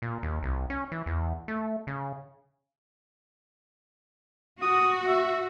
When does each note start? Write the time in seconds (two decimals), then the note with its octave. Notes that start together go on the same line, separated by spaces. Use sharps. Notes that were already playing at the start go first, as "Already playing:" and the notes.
0.02 A#2
0.23 D#2
0.43 C2
0.70 C#4
0.92 E3
1.06 E2
1.48 A3
1.87 C#3
4.62 F#4 D#6
5.07 E5